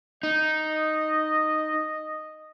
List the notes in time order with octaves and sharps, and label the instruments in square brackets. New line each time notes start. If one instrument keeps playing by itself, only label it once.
[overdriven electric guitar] D#4 [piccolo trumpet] D#5